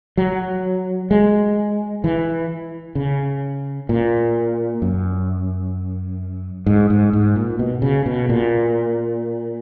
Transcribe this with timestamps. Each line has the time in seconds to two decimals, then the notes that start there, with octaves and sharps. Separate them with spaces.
0.17 F#3
1.11 G#3
2.04 E3
2.95 C#3
3.89 A#2
4.82 F#2
6.66 G#2
6.90 G#2
7.13 G#2
7.36 A#2
7.59 B2
7.82 C#3
8.06 B2
8.29 A#2